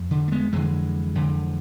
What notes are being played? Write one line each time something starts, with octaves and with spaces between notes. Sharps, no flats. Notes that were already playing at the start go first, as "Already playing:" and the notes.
Already playing: F2
D3
A3
G#3 B3
F2 D3 E3 G#3
F2 D3